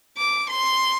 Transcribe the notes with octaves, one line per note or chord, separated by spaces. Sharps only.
D6
C6